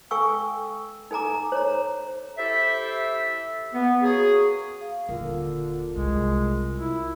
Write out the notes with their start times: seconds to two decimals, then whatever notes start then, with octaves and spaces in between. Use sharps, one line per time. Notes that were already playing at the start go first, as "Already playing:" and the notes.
0.11 A4 F5 G5 G#5 C#6 E6
1.11 D#4 A4 G#5 A#5 D6
1.52 C5 C#5 A#5
2.38 E4 G4 A4 C5 E5
3.74 B3
4.02 A#3 C#4 F#4 G#4
4.81 F5
5.09 D#1 D3 F4 A#4
5.96 C2 G#3
6.78 E4